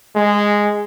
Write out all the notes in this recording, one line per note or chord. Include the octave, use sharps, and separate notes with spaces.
G#3